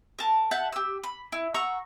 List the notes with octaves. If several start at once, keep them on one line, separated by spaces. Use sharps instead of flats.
A#4 A5
E5 F#5 A5 G6
G4 E6
B5
E4
F#5 A#5 C#6 E6